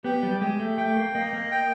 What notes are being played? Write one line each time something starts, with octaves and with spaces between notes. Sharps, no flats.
B3 G4
G3
G#3 G4
A3
A3 G5
A#3
A#3 D#5
A#3
G5